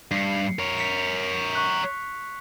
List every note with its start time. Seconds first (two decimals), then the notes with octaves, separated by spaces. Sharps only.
0.11 G2 C7 C#7
0.59 A#4 C#5
0.78 B6 C#7 F7
1.53 C#6 F#6 B6